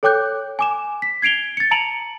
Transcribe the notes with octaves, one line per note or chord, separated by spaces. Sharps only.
A4 C#5 G5 D6 F#6 G6
G#5 D6 E7
B6
G#6 C7 D7 F7 G7
A6 C#7
A5 A#5 C#7 D7 F7 F#7